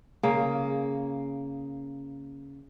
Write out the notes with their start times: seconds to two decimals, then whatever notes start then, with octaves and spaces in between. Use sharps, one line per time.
0.23 C#3 A#3